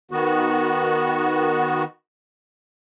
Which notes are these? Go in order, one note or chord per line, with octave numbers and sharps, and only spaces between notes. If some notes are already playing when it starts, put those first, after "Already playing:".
D#3 B3 F#4